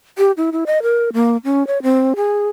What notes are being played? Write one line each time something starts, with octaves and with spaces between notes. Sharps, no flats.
G4
E4
E4
D#5
A#4
A#3
C#4
C#5
C4
G#4